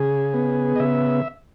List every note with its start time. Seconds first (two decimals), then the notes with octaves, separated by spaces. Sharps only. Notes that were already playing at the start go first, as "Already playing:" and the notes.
Already playing: C#3 G#4
0.34 B3
0.76 D#5
0.80 C#3 E5